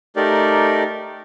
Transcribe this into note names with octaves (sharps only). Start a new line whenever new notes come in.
A3 D#4 G4 A#4 D5